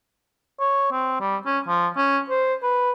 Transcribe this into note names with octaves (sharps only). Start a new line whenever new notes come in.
C#5
C4
G3
C#4
F3
C#4
C5
B4